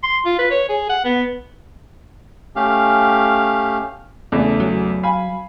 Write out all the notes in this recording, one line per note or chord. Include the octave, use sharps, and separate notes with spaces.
C6
F4
B4
C#5
G#4
F#5
B3
A3 C#4 G4 F5
E2 C#3 A3
F#3
F5 G#5 B5